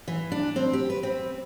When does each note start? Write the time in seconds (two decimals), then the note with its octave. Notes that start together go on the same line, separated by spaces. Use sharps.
0.08 E3
0.32 D4
0.56 C4
0.73 G4
0.90 B4
1.03 C4